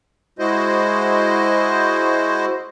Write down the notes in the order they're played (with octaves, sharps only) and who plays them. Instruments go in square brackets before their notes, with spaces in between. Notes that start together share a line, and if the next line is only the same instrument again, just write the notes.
[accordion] G#3 E4 F#4 C5 D#5